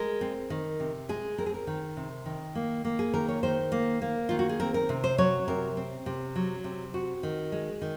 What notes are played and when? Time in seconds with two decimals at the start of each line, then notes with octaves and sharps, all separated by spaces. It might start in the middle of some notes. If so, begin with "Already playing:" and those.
Already playing: G#3 A#4
0.21 C4
0.50 D#3
0.80 C3
1.09 G#3 G#4
1.38 C4 A#4
1.46 G#4
1.54 A#4
1.67 D#3
1.97 C3
2.26 D#3
2.55 A#3
2.85 A#3
2.99 G#4
3.13 D#3 A#4
3.28 C#5
3.43 D#3 C5
3.72 A#3
4.02 A#3
4.29 D#3 F4
4.39 F#4
4.49 G#4
4.60 C4 A#4
4.74 A#4
4.89 C3
5.04 C5
5.18 F#3 C#5
5.48 C3 A#4
5.77 C4
6.06 C3
6.35 F#3
6.64 C3
6.94 C4 F#4
7.23 D#3
7.52 G#3
7.82 D#3